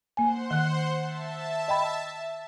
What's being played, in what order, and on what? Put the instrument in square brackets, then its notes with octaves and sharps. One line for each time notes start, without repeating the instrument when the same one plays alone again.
[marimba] A#3 G#5 [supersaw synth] C5 F#5 C6
[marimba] D#3 F#6
[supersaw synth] E5 A5
[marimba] D#5 G5 B5